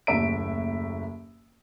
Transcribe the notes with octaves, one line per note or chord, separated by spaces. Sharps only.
F#1 D#2 A2 E5 D7